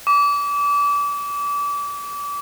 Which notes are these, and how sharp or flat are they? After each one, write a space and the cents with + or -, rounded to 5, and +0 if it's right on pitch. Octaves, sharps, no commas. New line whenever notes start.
D6 -30